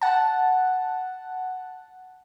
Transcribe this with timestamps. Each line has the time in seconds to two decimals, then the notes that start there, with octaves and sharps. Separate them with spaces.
0.02 F#5 A5